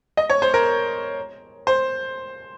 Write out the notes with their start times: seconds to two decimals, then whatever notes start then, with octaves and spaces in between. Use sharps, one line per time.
0.17 D#5
0.30 C#5
0.42 C5
0.54 A#4
1.67 C5